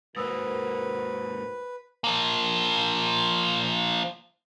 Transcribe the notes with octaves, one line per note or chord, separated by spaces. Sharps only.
G#2 D#3 A#3 F#4 B4 C5 D#6 E6
F3 A#3